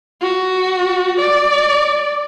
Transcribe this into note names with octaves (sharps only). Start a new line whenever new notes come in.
F#4
D5